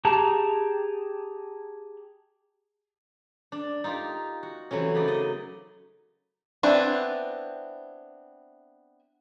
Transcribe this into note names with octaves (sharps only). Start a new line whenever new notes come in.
G4 G#4 A5 A#5
D4
D#4 F4 G4 A#4
F#4
C3 E3 F#3 A3 C#4
F#2 C#3 D#4 B4 D5
D#5
B3 C4 D4 E4 G#5